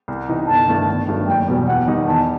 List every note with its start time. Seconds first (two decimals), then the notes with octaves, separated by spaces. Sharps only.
0.08 C2
0.28 C3 E3 B3 D#4
0.48 G1 A5
0.68 G2 D#3 A3 E4
0.88 G1
1.08 G2 D#3 F#3 A3
1.28 F#1 G5
1.48 E2 B2 G3
1.67 E2 F#5
1.88 D#3 G3 D#4
2.07 E2 A5